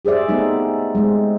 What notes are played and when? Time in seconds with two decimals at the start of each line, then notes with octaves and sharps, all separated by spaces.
0.05 G4 G#4 C5 D5 E5
0.29 A3 B3 C4 D#4
0.95 G#3 C4